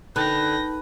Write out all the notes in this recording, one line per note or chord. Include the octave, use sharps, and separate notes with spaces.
D3 D#4 B4 G5 A#6